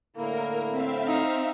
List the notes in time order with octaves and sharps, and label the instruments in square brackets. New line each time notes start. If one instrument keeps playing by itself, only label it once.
[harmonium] A2 D3 E4 [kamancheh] A#3 [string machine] A#4
[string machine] C4 E5 F5
[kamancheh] D#4